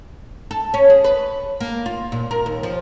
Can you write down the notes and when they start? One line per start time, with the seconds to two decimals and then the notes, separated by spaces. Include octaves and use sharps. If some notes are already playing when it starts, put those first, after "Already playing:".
0.51 A4
0.74 C#4
0.90 G#4
1.04 B4
1.60 A#3
1.86 F4
2.12 A#2
2.31 A#4
2.46 D#2
2.63 F3